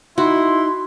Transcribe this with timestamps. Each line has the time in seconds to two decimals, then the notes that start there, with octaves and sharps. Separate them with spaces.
0.18 D#4 E4 F#4 C6